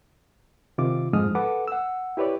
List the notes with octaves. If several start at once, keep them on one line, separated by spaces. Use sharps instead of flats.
C3 D#3 F4 D6
F2 G#2 F3 G#3 D#6 F6
A4 B4 F#5 D6
F#5 E6
E4 G4 B4 C#5 D5